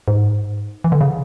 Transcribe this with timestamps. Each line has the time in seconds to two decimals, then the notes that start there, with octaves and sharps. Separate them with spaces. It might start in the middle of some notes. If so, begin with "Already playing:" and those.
0.08 G#2
0.84 E3
0.92 D3
1.01 C#3